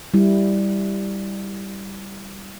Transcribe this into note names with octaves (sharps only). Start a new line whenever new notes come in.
G3 E4